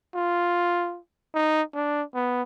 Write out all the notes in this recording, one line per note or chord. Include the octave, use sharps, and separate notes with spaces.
F4
D#4
D4
B3